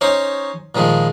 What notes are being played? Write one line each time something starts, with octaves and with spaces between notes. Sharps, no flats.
C#4 D#4 C5 C#5
A#2 D#3 F3 G#3